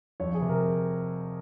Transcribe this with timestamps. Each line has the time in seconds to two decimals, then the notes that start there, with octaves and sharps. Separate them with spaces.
0.20 F2 C#5
0.34 G#4
0.42 C3
0.49 A#4